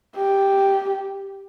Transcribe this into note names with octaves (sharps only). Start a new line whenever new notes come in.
G4